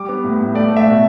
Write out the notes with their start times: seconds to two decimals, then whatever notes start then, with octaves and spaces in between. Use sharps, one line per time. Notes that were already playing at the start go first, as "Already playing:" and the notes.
Already playing: G3 D6
0.09 B3
0.24 A2
0.40 A2
0.55 A3 D5
0.71 A3
0.76 E5
0.86 B2